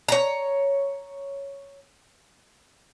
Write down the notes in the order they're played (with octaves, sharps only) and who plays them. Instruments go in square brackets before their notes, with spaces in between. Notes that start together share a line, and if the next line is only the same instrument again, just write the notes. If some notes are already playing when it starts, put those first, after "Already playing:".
[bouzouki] C#5 A#5